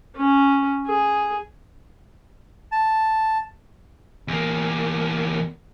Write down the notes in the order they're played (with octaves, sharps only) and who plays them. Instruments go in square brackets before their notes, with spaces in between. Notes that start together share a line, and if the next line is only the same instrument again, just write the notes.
[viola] C#4
G#4
[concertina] A5
[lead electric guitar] E2 A#3